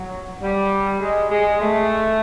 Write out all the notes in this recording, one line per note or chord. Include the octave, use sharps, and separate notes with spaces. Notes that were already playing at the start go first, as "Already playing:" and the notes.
Already playing: F#3
G3
G#3
G#3
A3